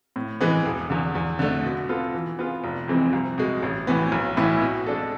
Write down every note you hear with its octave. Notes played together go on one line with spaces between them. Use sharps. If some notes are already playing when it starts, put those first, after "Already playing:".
A2
E3 G#3 B3
E1
E2 D3
E2
D3 A3 D4
B2
B3 F4 A4
E3
B3 F4 G#4
F1
F2 E3 G#3 C4
C2
B2 G#3
A1
A2 E3 B3
B1
A2 E3 B3 E4
B2
G#3 D4 A4